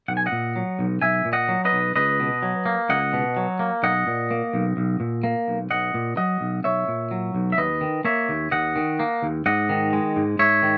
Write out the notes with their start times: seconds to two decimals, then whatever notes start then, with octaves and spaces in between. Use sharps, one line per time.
0.08 B1 F#5
0.17 G#5
0.26 D#5 F#5
0.32 A#2
0.56 F#3
0.79 B1
1.02 B1 E5 G#5
1.25 A#2
1.33 D#5 F#5
1.48 F#3
1.65 B4 D#5
1.73 B1
1.96 C#2 B4 D#5
2.20 B2
2.43 F#3
2.66 A#3
2.89 C#2 D#5 F#5
3.13 B2
3.37 F#3
3.59 A#3
3.83 B1 D#5 F#5
4.07 A#2
4.31 A#3
4.54 B1
4.77 B1
5.00 A#2
5.24 A#3
5.48 B1
5.70 B1 D#5 F#5
5.94 A#2
6.17 F#3 D#5 F#5
6.41 B1
6.64 B1 C#5 E5
6.88 A#2
7.11 F#3
7.35 B1
7.52 E5
7.58 D#2 B4 D#5
7.81 D#3
8.04 A#3 C#5 E5
8.29 D#2
8.51 D#2 D#5 F#5
8.76 D#3
8.99 A#3
9.23 D#2
9.46 G#2 D#5 F#5
9.69 D#3
9.93 G#3
10.16 G#2
10.39 G#2 C#5 E5
10.62 D#3